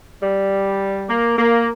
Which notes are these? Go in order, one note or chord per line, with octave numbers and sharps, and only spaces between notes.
G3
A#3
A#3